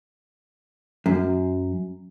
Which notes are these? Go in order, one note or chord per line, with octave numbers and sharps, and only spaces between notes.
F#2